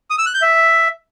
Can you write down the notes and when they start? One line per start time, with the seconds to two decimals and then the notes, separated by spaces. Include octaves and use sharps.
0.10 D#6
0.18 E6
0.26 F#6
0.34 G6
0.42 E5